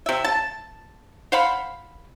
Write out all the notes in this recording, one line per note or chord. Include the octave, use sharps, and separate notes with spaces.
C3 E5
A5
C5 F5 F#5 B5